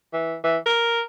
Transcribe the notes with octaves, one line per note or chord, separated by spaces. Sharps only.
E3
E3
A#4